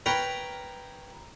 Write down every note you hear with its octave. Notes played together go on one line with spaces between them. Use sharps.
A#4 B4 C#5 G5 A#5